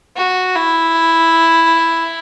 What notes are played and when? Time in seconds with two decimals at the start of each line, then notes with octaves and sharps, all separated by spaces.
0.17 F#4
0.56 E4